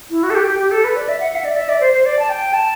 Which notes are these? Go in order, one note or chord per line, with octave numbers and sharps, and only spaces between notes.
E4
F#4
A4
G4
G4
G4
A4
B4
D5
E5
F#5
E5
D5
E5
D5
C5
C5
D5
A5
G5
A5